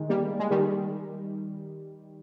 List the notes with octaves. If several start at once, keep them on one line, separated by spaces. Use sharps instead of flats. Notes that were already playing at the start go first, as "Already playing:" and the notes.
Already playing: D#3 G#3
G3 A#3
G#3
D#3 G3